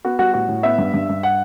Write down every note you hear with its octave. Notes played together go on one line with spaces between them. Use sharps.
B3 F#4
G3 F#4
A2 F#4
A2
B3 E5
G2
G2
G2
F#5